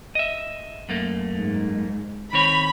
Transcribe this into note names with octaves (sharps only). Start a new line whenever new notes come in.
D#5 E5
F#2 A3 A#3
G#2
D#3 C4 C#5 B5